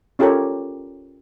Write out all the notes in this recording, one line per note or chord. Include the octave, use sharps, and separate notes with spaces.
C#4 F4 G4 A4 A#4 C#5